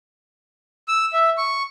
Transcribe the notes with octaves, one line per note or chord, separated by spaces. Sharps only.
E6
E5
C#6